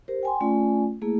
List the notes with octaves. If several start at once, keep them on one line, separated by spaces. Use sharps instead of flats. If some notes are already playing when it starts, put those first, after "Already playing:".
G4 A#4 C5
G5 G#5 C6
A3 C#4 F4 D5 G#5
A3 A#3 E4 G#4